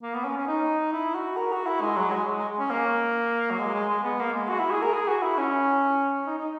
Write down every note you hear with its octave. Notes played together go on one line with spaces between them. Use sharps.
A#3
B3
C#4
C#4
D#4
E4
F#4
A#4
F#4
E4
G#3
F#3
G#3
G#3
C#4
A#3
F#3
G#3
G#3
G#3
B3
A#3
G#3
F#4
E4
G#4
A#4
G#4
F#4
E4
C#4
D#4
D#4